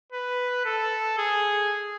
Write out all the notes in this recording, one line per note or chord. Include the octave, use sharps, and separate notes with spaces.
B4
A4
G#4